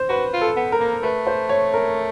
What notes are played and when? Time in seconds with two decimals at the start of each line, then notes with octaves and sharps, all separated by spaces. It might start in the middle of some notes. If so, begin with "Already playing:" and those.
Already playing: C5
0.09 F#4 B4
0.33 F4
0.41 A4
0.56 B3
0.72 A#4
0.80 A#3
1.03 A3 B4
1.27 C5
1.49 C#5
1.74 A#4